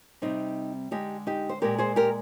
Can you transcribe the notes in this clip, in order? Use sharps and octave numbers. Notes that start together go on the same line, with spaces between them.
C3 G3 C4 D#4
D3 G#3 D#4 G4
D#4 G4
C5
A#2 G#3 G4 A#4
G#4 C5
G4 A#4